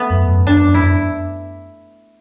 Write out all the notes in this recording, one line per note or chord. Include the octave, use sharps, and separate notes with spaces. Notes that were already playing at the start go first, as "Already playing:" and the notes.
Already playing: A3 B3
F#2
F#2
F#2 D4
F#2
E4
F#2